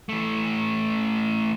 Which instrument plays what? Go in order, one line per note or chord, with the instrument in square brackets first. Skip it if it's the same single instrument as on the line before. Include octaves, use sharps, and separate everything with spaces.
[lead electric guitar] E3 A3